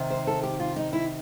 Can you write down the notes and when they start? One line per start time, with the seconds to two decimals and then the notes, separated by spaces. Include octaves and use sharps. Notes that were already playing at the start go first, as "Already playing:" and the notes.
Already playing: C3 D#3
0.10 C5
0.27 A4
0.43 G4
0.60 F4
0.76 D#4
0.93 E4